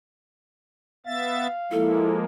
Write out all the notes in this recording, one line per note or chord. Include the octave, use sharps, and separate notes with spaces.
B3 E5 F5 A6
F3 G#3 A#3 E4 A4